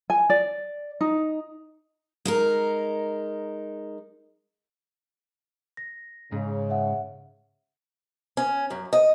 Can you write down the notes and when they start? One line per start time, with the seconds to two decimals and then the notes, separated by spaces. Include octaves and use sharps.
0.10 G#5
0.30 D5
1.01 D#4
2.25 G#3 D#4 A#4
5.77 A#6
6.32 G#2 C#3
6.70 E5 F#5
8.37 C#4
8.70 F#2
8.93 D#5